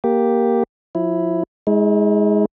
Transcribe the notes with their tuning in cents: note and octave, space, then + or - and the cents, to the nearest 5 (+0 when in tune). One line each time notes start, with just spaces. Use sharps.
A#3 +5 G4 +0
F3 +30 E4 +0
G#3 +0 E4 -45